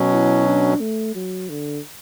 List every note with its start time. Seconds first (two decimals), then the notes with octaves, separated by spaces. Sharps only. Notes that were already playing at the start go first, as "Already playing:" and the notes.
Already playing: B2 F#3 C#4
0.12 E4
0.46 D4
0.80 A3
1.15 F#3
1.49 D3